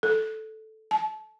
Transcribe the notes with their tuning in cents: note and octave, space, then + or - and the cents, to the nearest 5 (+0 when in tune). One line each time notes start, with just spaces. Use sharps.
A4 -5
A5 -30